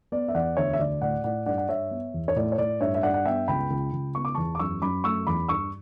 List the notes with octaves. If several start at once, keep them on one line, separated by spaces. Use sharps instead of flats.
B3 D5
E5
E2 D5 F#5
D2 C#5 E5
E5
D2 D5
A2 D5 F#5
A2 D5 F#5
G2 D5 F#5
F#5
G2 C#5 E5
B3
E2
C#5
A2 D5
C#5
A2 D5
G2 C#5 E5
E5
G2 D5 F#5
F#5
B3 E5 G5
C#2 G5 B5
C#2
C#2
B3 C#6
D6
E2 A5 C#6
D6
F#2 C#6 E6
F#2 B5 D6
A3 C#6 E6
E2 B5 D6
G2 C#6 E6